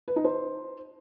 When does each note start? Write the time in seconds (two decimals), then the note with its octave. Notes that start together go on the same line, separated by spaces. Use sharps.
0.08 B4
0.16 D#4
0.25 C5